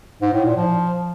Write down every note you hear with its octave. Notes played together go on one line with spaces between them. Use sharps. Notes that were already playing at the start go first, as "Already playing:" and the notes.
G#2
A2
A#2
F3